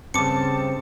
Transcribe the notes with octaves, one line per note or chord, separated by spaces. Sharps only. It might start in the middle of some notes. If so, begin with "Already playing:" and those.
G2 C#3 C4 A5 D6 C#7